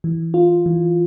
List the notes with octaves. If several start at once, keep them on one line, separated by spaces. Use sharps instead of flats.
E3
F4
E3